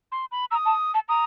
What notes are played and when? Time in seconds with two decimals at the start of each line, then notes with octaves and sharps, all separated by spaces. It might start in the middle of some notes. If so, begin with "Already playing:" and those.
0.12 C6
0.32 B5
0.51 A#5 E6
0.55 D#6
0.65 A5
0.94 A5
1.09 A#5 D#6